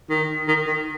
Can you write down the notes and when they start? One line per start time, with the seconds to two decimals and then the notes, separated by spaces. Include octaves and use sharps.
0.10 D#3
0.48 D#3
0.66 D#3